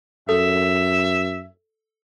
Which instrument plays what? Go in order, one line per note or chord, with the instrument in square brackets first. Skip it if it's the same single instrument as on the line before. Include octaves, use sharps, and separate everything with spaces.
[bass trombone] F#2 [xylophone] A4 [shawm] E5